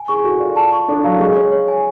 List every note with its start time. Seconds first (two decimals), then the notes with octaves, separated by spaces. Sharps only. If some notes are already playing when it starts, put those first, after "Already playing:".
Already playing: G#5
0.08 G#4 C#6
0.24 F#4 A4
0.40 F4 D5
0.56 A5
0.73 C#6
0.88 D4 A4
1.04 F#3 F5
1.20 G#3 C#6
1.36 C#5
1.52 C#5
1.68 G#5